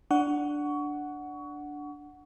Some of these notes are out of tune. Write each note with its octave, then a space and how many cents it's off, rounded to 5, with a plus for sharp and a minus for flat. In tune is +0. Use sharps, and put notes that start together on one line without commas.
D4 +0 F#5 +0 C#6 +25